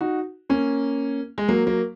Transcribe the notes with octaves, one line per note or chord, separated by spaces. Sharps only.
D#4 F#4
A#3 C#4
G#3
F#3 A#3
F#3 A#3